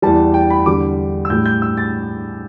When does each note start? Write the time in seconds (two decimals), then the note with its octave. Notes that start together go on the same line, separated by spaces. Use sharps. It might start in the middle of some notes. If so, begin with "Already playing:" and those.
0.02 E2 E3 G3 A5
0.34 G5
0.50 B5
0.66 E2 D3 G3 D6
1.25 E6
1.30 A2 G3 G6
1.46 G6
1.62 E6
1.77 A6